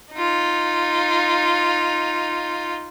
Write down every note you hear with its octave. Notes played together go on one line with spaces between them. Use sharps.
D#4 F4